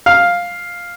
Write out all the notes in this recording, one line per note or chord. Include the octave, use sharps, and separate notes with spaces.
F5